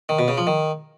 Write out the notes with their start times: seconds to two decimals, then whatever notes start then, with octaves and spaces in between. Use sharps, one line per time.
0.09 D#3
0.19 B2
0.28 C#3
0.37 F3
0.47 D#3